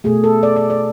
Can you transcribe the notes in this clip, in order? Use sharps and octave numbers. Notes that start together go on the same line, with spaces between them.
B2 A3 G#4
A4
D5
D5
D5